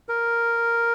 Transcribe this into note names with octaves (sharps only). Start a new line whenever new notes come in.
A#4